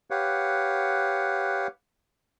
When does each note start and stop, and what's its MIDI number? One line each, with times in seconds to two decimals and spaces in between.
0.10 1.67 67
0.10 1.67 71
0.10 1.67 73
0.10 1.67 77
0.10 1.67 78